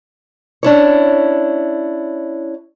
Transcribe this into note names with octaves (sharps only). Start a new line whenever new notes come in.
C#4 D4 E4 C#5